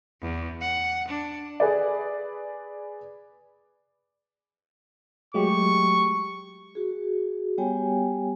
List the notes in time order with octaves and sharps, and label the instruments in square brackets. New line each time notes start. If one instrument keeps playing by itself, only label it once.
[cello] E2
F#5
D4
[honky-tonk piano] G#4 B4 D5
[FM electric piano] F#3 G#3 [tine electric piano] A3 G4 [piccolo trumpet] C#6
[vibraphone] F#4 G#4
G3 B3 G4 C#5 G5 G#5